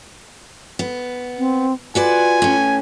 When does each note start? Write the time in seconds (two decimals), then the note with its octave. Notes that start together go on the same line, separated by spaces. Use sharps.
0.79 B3
1.38 C4
1.95 F4 F#4 B4 D5 G#5
2.42 A2 C#4